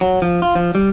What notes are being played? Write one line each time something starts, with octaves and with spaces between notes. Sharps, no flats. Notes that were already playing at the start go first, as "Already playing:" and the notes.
F#3
F3
F4
F3
G3